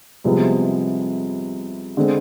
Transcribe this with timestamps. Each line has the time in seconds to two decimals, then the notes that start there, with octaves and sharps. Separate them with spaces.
0.24 C2 C3 F3 G#3 B3
1.97 D3 G#3 C4